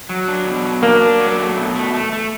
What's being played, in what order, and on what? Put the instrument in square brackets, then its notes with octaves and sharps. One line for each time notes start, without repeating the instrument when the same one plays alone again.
[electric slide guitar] F#3
D4
B2
F#3
[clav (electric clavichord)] A#3 [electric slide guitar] D4
[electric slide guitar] D4
F#3
A3
B2
A3
A3
A3